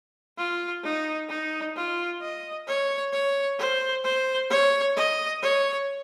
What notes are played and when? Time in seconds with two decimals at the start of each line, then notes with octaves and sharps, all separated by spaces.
0.38 F4
0.84 D#4
1.29 D#4
1.76 F4
2.21 D#5
2.68 C#5
3.12 C#5
3.59 C5
4.04 C5
4.50 C#5
4.96 D#5
5.42 C#5